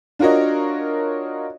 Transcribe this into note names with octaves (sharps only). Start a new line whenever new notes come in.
D4 F4 F#4 A#4 C#5 D#5